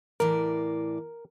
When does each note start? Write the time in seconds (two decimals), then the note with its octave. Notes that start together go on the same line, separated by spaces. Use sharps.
0.20 A2 E3 A#4 D5